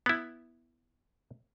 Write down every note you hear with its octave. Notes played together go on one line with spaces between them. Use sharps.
B3 E4